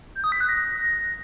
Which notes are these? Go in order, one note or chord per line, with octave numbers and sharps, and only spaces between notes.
G6
D#6
B6
F#6
A#6